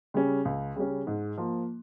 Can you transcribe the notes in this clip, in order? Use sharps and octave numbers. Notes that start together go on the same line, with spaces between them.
C#3 G3 C#4
C#2
C#3 G3 C#4
G#2
F3 A#3